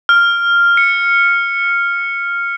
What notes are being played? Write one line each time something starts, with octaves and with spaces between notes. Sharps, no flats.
F6
C#7